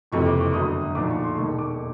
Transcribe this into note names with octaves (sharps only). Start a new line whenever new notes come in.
F#1 F2 C3 E3 C#6
D6
D6
G1 F#2 D3 D#6
D#6
D#6
B1 A#2 F3 D6
C#6
C6
E1 D#2 D#3 C#6
D6